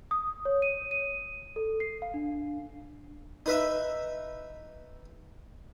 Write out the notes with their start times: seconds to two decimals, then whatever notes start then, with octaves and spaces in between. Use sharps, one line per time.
0.11 D#6
0.45 C#5
0.62 D#7
0.91 D#7
1.56 A4
1.80 C7
2.02 F5
2.14 D4
3.46 D#4 B4 E5